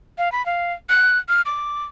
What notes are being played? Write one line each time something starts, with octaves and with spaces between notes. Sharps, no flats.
F5
B5
F5
F#6
F6
D6